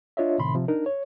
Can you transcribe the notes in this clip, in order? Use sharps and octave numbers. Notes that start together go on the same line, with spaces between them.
D4 F4 C#5 D#5 E5
A2 C3 D#3 B5 C6
C3 F3
D4 D#4 A#4
C#5